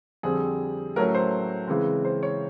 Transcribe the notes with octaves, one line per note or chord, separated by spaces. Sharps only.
F2 D3 G3 C4 G#4
A2 F#3 A3 C#4 A#4
C5
C#3 E3 G#3 C4
C5
C#5